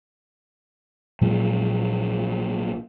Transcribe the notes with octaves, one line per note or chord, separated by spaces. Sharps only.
A#1 A#2 F#3 G#3